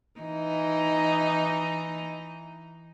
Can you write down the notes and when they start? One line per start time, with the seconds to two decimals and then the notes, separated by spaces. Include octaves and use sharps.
0.20 E3 D#4